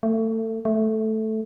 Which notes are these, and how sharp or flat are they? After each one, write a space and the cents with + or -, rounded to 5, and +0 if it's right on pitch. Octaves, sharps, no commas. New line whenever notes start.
A3 +25
A3 -5